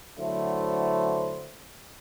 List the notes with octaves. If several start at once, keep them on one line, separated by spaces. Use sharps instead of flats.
D3 F#3 A3 E4 C5